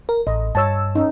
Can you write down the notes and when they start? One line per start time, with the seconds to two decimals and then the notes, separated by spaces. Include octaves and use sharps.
0.09 A#4
0.27 A1 D#5
0.55 G2 C#5 A5 E6
0.95 C#4 D#4